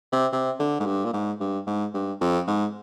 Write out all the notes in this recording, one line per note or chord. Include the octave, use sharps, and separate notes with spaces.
C3
C3
D3
G#2
G2
A#2
G#2
G2
G#2
G2
F2
G#2